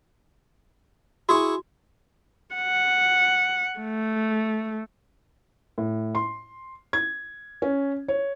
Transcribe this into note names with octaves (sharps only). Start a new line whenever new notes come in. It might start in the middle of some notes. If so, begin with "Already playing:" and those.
E4 F#4 G#4 C#6
F#5
A3
A2
C6
G#6
C#4
C#5